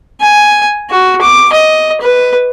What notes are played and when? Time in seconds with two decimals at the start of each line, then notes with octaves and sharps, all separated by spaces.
0.20 G#5
0.90 F#4
1.21 D6
1.52 D#5
2.01 B4